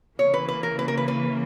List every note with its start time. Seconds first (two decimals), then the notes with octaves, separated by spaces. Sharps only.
0.18 C#3 E3 A#3 C#5
0.34 B4
0.48 B4
0.63 A#4
0.79 B4
0.88 A#4
0.97 B4
1.08 B4